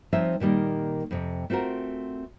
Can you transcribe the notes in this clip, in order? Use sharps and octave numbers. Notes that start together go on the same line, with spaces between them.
F3 G3 C4 D#4 C#5 E5
A#2 D#3 G3 A#3
F2 C3
A3 C4 F4 F#4 A#4